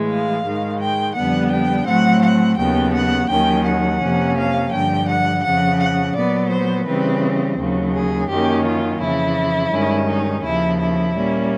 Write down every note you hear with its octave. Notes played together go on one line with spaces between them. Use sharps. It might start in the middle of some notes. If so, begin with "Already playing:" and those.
Already playing: A2 E3 G#3
F5
G#2 D#3 G#3
G5
F2 D3 G3 B3 F#5
G5
A2 F#3 A3 C4 F#5
F#5
D#2 C#3 F#3 B3 G5
F#5
D#2 D#3 F#3 A#3 C#4 G5
F#5
F2 C3 F3 A#3 C#4
F5
G2 D3 F3 G5
F#5
F2 C#3 F3 F#5
F#5
A#2 F#3 B3 D5
C5
C#3 E3 G3 C4 B4
D#2 C#3 F#3
G#4
F#2 D#3 F#3 A#3 C#4 G4
F4
F2 C#3 E3 E4
G2 D#3 G#3 C#4
D#4
D#2 C#3 F3 E4
E4
A#2 G3 A#3 C#4